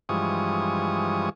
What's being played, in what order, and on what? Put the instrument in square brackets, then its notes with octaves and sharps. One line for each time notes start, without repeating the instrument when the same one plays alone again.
[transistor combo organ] G2 E3 F3 G#3 C#6 D#6